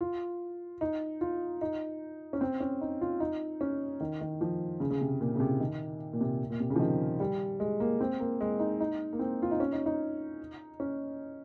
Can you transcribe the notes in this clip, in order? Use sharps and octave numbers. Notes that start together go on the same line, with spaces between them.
F4
D#4
F4
D#4
C#4
C4
C#4
D#4
F4
D#4
C#4
D#3
D#3
F3
C#3
C#3
C3
A#2
C#3
C3
D#3
A#2
C3
A#2
C3
C#3
F3
D#3
G3
G#3
A#3
C4
A#3
G#3
D#4
D#4
A#3
C4
F4
D#4
C#4
D#4
D#4
C#4